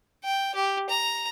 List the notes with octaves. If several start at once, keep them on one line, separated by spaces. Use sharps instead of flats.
G5
G4
A#5